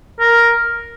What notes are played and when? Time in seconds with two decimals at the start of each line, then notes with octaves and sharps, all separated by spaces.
0.20 A#4